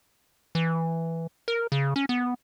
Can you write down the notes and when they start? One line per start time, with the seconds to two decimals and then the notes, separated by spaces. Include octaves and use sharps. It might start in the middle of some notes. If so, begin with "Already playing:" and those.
0.55 E3
1.48 A#4
1.72 C#3
1.96 C#4
2.09 B3